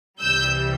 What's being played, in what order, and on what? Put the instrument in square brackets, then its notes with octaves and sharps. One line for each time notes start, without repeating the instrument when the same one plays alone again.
[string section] C2 C3 E3 G3 E6 G6